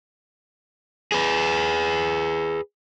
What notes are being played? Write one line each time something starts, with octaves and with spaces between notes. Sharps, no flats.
G#4 B4